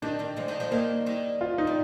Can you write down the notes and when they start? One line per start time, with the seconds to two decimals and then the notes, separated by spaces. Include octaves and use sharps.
0.02 D#3 G3 D4
0.19 D#3 G3
0.37 F3 G#3
0.48 D#3 G3
0.60 F3 G#3
0.71 D#3 G3 A#3
1.06 D#3 G3
1.41 F4
1.58 D#4
1.67 G3